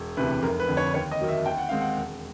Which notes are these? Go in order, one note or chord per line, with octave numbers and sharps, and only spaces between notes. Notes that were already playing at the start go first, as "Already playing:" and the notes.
Already playing: E1
D2 C3 E3 B4
F1 A#4
B4
F2 D3
C#5
D#2 C#5
D#5
D#3 F#3 A#3
E5
D#2 G5
F#5
D#3 G#3 C4 F5
F#5
E1